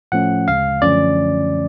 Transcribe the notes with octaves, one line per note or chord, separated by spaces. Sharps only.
A2 F3 A3 C#4 F#5
D2 C#3 G#3 F5
F#2 D3 F3 A3 C#4 D5